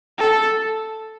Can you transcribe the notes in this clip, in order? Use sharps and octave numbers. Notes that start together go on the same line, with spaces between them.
A4